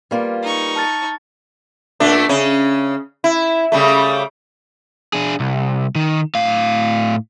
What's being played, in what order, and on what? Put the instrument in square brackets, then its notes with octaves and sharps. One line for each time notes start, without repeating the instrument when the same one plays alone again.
[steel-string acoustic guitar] G3 A#3 F4 [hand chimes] B4
[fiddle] D#4 C#6
[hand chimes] A5 F6 A6
[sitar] A#2 A3 D4
C#3 C#4
E4
C#3 G3 A3
[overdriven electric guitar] D4 G#4
C2
D#3
A2 F5